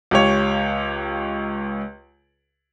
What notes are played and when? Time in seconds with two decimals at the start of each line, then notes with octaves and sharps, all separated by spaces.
0.11 C#2 G4 C#5